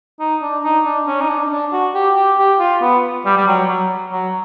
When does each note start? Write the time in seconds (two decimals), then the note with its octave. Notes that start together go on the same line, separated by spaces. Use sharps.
0.20 D#4
0.42 D4
0.64 D#4
0.85 D4
1.07 C#4
1.21 D#4
1.29 D4
1.51 D4
1.73 F#4
1.95 G4
2.16 G4
2.38 G4
2.60 F4
2.82 B3
3.26 G3
3.38 G3
3.47 F#3
3.69 F#3
4.12 F#3